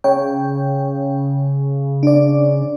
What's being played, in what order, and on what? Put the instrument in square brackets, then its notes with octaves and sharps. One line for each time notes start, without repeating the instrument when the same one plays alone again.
[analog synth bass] C#3 [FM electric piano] C#5 G5
[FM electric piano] D4 D5